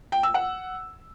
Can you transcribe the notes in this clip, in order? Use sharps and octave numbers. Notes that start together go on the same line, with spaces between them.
G5
E6
F#5